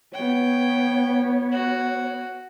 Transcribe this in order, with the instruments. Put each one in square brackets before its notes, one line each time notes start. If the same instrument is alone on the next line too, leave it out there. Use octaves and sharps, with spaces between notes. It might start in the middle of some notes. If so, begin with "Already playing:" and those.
[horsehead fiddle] B3 C#5 [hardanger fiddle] G5
[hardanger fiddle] F#4